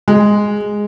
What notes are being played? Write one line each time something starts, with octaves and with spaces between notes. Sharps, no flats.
G#3